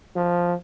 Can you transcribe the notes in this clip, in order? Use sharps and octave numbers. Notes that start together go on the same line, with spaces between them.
F3